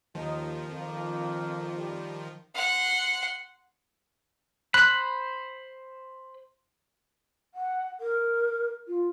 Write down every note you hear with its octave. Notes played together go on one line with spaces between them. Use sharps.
D#2 D#3 F3 D#4
F2 A#3
G3
F#5 C6
C5 B5 F#6
F#5
A#4
F4